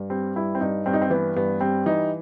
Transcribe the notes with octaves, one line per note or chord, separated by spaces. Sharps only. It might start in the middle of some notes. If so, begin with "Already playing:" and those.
Already playing: G2
G3 C4
G2 E4
C4
G2 D#4
G2 C4
D#4
C4
E3 B3
G2 B3
G3 C4
E3 D#4